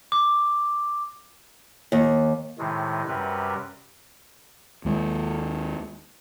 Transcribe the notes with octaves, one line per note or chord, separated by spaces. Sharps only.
D6
D#2
A2 C3 D#3 G#3
F#2 C3 G3 A#4 B4
D#2 G#3